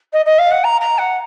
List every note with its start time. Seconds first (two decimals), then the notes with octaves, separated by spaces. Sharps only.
0.13 D#5
0.25 D#5
0.38 F5
0.51 F#5
0.64 A#5
0.81 A#5
0.98 F#5